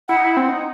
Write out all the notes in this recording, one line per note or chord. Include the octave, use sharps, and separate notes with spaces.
E4 F#5
D#4
E4
C4
D#4